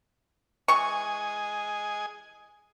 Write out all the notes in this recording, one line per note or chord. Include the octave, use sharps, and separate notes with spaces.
E3 G#4 D#5 G#5 C#6